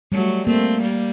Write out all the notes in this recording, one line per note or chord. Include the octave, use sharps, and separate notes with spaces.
F#3 G3 A3
A3 A#3 C4
G3 A#3